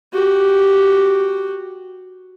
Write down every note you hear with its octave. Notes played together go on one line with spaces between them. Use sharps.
F#4 G4